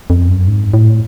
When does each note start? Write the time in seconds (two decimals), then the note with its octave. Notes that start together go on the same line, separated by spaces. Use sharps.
0.10 F2
0.28 F#2
0.47 G#2
0.74 A2